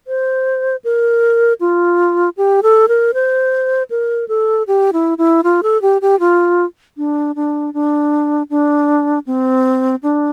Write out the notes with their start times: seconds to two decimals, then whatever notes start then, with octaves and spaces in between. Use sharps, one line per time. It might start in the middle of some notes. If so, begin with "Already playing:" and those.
0.07 C5
0.84 A#4
1.61 F4
2.37 G4
2.63 A4
2.88 A#4
3.14 C5
3.90 A#4
4.28 A4
4.67 G4
4.93 E4
5.18 E4
5.44 F4
5.63 A4
5.82 G4
6.02 G4
6.20 F4
6.97 D4
7.36 D4
7.74 D4
8.50 D4
9.26 C4
10.03 D4